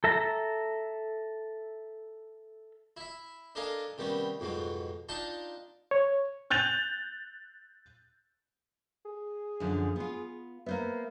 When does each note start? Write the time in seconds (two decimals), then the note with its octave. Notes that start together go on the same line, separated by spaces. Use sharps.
0.04 A4 E5 A#5
2.97 E4 E5
3.55 D4 A4 A#4 D#5 F5 G#5
3.98 C3 D#3 G3 B3 C#4
4.40 F2 G#2 B2 F#3
5.09 D4 D#4 F4 G5 A5
5.91 C#5
6.50 F#6 G6 A6 F7
9.05 G#4
9.60 F#2 D3 F3
9.96 B3 F4
10.66 A#3 B3 C5 E5